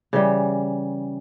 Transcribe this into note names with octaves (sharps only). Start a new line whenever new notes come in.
C#3 E3 G3